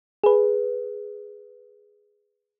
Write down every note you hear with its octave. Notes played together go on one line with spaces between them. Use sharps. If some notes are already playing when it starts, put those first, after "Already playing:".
G#4 B4